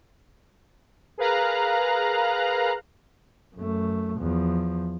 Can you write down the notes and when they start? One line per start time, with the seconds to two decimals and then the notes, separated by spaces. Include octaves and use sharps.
1.18 G#4 A#4 B4 F5 A#5 F#6
3.56 F#2 A3
4.18 E2 F3